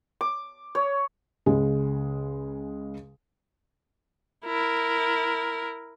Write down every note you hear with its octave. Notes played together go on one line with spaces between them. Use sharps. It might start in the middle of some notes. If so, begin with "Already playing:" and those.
D6
C#5
C#2 C#3 G#3
E4 A#4